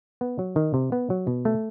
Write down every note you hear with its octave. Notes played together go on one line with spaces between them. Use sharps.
B3
F#3
D#3
C3
B3
F#3
B2
A3